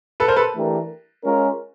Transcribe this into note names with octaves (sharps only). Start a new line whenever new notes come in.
A4 B4
A#4 C5
A4 B4
E3 A3 D4 G4 A#4
G#3 C#4 F4 A#4